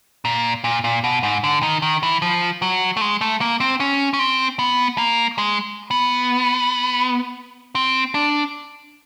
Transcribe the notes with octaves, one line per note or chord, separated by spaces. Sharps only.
A#2
A#2
A#2
B2
G#2
D3
D#3
D#3
E3
F3
F#3
A3
G#3
A3
A#3
C4
C#4
C#4
C4
B3
A#3
G#3
B3
C4
D4